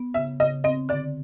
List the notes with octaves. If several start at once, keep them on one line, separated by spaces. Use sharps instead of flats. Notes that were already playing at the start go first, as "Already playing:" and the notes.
Already playing: B3
C#3 E5
C#3 D#5
C4 D#5
D3 D5